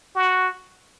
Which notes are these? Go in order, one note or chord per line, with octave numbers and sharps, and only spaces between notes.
F#4